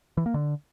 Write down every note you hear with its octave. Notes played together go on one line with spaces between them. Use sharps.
E3
A#3
D3